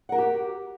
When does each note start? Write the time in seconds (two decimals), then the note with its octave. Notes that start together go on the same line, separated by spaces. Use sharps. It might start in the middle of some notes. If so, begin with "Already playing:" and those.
0.09 F#5
0.12 A#4
0.15 F#4
0.18 G4